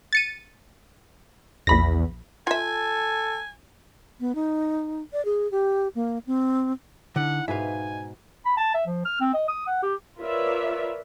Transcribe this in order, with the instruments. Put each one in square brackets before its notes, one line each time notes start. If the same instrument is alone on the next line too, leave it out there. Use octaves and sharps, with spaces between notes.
[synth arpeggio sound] A6 C#7 D#7
[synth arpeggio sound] A#1 B5 A#6 [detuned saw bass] E2
[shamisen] F4 E5 [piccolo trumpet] A4 [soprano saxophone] G#5
[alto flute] B3
D#4
D5
G#4
G4
A#3
C4
[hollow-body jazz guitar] D3 [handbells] D#4 E4 [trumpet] F#5
[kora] G#2 B2 B4 [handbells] D#4 [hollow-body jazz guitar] E5 F5 [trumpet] G#5
[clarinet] B5
A5
E5
F3
F6
C4
D#5
D#6
F#5
G4
[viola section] F4 A#4 B4 C#5 D5 E5